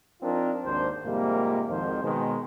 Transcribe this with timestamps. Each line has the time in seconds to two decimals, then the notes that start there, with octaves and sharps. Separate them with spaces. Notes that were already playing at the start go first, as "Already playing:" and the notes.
0.22 F3 C4 D4 D#4 F4 A#4
0.65 G#1 D#2 D#3 D4 C5
1.05 F2 G#2 C3 G3 A#3
1.68 G#1 F2 G#2 D#3 F3 C5
2.03 B2 D#3 G#3